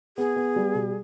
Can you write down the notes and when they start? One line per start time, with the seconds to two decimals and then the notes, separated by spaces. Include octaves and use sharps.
0.18 B3 G#4
0.36 B3
0.56 G3
0.75 B2